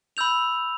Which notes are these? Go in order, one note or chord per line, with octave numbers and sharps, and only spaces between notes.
B5 E6 G6 F7